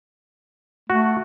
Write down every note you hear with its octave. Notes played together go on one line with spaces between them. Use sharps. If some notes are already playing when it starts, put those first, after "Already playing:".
A3 F#4